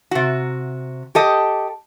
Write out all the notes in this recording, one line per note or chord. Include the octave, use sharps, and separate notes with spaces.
C3 F#4
G4 A4 D#5